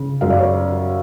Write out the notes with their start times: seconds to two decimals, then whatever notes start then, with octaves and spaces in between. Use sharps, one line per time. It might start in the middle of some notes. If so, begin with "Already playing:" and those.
Already playing: C#3
0.21 F#2 F5
0.30 D5
0.38 C#5